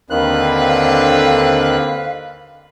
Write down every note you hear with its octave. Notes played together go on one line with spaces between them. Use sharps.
D#2 D3 D#3 C4 B4 F5 F#6